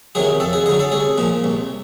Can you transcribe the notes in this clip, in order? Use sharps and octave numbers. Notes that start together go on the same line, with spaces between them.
C3 D#3 F#3 G#4
F2 A4
G#4
D3 G#4
F#3
A4
C2 G#4
A#2 F3
C2